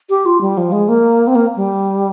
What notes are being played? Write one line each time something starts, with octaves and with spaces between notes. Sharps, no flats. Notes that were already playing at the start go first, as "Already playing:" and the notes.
G4
F4
G3
F3
G#3
A#3
C4
A#3
G3